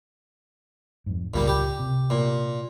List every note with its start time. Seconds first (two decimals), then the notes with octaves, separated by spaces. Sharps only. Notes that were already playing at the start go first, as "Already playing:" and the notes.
1.06 F2 G#2
1.34 C#2 A#2 G3
1.47 G4
1.80 C3
2.10 A#2